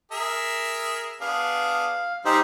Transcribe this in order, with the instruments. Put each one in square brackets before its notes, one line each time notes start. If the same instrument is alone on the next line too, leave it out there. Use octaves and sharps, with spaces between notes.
[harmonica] G#4 A#4 E5
[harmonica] B3 D4 G#4 [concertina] F5
[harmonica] G3 C4 G#4 [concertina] D#4 G4 C5